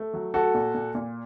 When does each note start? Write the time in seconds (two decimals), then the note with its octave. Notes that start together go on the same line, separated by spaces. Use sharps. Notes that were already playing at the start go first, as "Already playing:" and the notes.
Already playing: A3
0.14 F#3
0.34 A3 F#4 A4
0.54 A#2
0.74 A#2
0.95 A#2